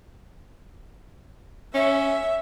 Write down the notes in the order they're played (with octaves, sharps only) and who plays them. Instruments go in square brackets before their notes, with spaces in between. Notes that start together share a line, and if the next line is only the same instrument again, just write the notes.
[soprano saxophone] C#4 [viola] E5